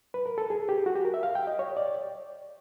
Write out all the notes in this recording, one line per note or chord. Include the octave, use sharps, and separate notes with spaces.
B4
A#4
A4
G#4
G4
F#4
G4
A#4
E5
F5
G5
D#5
C#5
D5